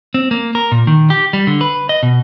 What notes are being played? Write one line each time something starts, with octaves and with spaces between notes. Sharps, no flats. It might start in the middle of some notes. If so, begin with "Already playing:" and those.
C4
A#3
A#4
A#2
D#3
G4
G3
D3
B4
D#5
B2